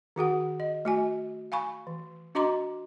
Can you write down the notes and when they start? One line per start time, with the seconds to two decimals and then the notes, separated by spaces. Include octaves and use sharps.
0.16 D#3 F#4 G#4 F#5
0.60 D#5
0.85 A3 F#4 G#5
1.52 F5 G#5 B5 C#6
1.87 E3
2.35 D4 F#4 D#5 A#5 C6 D6